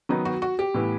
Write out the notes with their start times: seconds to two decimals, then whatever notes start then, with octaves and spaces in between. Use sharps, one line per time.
0.09 D#3 F#3 B3 D#4
0.25 F#4
0.42 F#4
0.59 G4
0.74 A2 E3 B3 E4